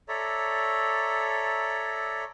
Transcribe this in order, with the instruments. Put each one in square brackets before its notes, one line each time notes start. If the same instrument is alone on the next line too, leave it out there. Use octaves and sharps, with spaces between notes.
[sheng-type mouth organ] A4 C#5 D5 E5 A#5